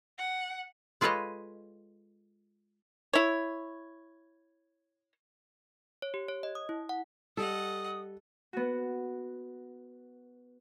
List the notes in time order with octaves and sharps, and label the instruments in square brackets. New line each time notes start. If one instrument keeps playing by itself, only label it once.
[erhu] F#5
[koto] G#3 F4 A4 B4 C#5 D#5
[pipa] E4 C#5
[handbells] C#5
G4
C#5
D#5
D#6
E4
F#5
[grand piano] G3 [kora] A4 [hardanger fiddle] D#5 F#5 [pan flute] D#6
[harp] B3 F#4